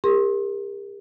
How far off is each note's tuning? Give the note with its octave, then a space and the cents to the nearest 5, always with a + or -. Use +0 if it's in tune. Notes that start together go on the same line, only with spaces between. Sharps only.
G4 +40 A#4 +0 C6 +30